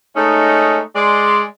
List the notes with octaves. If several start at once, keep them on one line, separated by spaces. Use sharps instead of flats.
G#3 A3 C#4 D#4
G#3 D5 C6